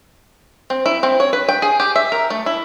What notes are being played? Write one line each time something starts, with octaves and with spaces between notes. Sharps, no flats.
C4
E4
C4
C#5
B4
G5
G#4
G4
E5
A#4
A3
E4